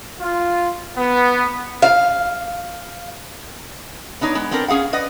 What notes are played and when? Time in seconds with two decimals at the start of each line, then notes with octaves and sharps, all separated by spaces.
0.19 F4
0.96 B3
1.82 F5
4.21 B3 D4 D#4 C#5
4.35 G#3 B3
4.51 B3 C4 D4 A4 A#4
4.68 C#4 G#4 F5 F#5
4.93 B4 D5 D#5 F#5